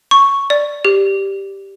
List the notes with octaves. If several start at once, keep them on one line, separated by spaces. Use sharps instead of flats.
C#6
D5
G4